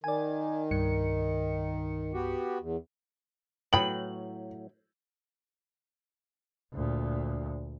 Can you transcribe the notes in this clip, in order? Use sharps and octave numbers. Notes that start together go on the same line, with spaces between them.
D#3 D5 G#5
C2 G2 C#7
B3 F#4 G4
E2
A2 F#3 B3 G5 B5 F#7
D2 A#2